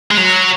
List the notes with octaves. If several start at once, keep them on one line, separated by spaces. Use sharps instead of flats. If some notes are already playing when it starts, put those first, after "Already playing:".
G#3
F#3